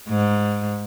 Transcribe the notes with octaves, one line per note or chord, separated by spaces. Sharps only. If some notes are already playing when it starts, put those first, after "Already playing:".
G#2